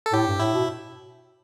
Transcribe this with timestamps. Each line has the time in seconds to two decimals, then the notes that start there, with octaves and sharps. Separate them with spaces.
0.06 A4
0.13 A2 G4
0.27 G2
0.40 A2 E4
0.53 B2